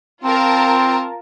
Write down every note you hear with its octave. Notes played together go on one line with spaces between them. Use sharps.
C4 F4 A#4 A5